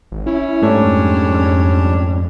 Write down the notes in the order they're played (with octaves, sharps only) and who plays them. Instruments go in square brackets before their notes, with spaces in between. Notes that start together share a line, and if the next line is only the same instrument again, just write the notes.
[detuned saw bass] G#1
[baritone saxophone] C#4 [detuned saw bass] E4
[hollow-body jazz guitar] G#2 A3 C#5 [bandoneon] G3 D4
[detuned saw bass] F2